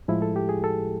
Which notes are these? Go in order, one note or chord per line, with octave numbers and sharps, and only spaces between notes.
A2 F3 G#3 E4
A4
G4
G#4
A4